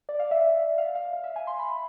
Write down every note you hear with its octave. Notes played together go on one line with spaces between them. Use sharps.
D5
F5
E5
F5
F5
F5
E5
G#5
C6
B5